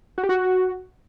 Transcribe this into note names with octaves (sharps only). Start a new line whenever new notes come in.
F#4
G4
F#4